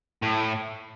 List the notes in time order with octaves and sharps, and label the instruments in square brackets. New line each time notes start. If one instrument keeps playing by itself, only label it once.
[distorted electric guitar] A2